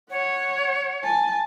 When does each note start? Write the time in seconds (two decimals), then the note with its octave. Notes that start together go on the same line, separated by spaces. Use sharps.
0.11 C#5 F#5
1.04 G#5 A5